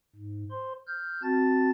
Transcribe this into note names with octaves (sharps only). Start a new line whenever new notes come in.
G#2
C5 C6
F6 G6
C4 F#4 A5 A6